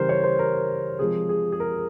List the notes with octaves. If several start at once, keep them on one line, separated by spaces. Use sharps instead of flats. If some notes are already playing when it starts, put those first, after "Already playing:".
Already playing: C#3 E3 G3 A#4 C5
C#5
C5
A#4
C3 F3 G#3 G#4
G#4
G#4
A#4